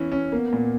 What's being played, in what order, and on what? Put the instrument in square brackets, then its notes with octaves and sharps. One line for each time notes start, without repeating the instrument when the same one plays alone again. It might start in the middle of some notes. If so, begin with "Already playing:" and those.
Already playing: [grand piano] E3 C#4
C#4
[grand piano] A#3 [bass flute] B3
[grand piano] A#2